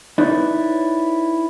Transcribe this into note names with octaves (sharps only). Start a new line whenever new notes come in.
D#4 E4 B4 C#5 D5